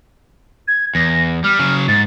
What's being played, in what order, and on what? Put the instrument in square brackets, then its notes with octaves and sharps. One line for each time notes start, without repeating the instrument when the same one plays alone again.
[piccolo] G#6
[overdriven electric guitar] E2 [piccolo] A#6
[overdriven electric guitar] G3 [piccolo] F6
[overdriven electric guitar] C#3 F#3
[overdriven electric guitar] G#2 [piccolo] A6